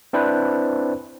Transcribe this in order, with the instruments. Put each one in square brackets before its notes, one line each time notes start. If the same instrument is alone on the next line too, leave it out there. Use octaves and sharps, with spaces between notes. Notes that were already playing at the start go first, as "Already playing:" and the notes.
[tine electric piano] C4 D4 E4 B4 C5